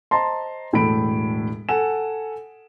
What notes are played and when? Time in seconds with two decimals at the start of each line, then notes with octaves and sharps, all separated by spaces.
0.11 C5 D#5 A5 A#5 C6
0.73 E1 A2 A3 A4 B5 D7
1.69 A4 F#5 G#5 E7